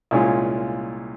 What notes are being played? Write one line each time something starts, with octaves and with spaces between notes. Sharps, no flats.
C2 A#2 G#3 C#4 F4